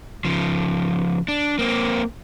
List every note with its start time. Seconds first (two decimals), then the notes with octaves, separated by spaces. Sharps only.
0.25 C#3 F3
1.28 D4
1.59 A#3 C4